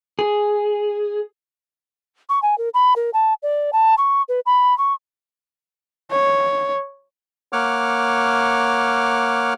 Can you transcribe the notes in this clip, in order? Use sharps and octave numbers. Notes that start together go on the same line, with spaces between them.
G#4
C#6
G#5
A#4
B5
A#4
A5
D5
A5
C#6
B4
B5
C#6
C#5
A#3 C#5 F#5 D6 F6